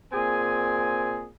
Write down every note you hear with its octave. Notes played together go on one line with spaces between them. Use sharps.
A#2 C4 G#4 G#5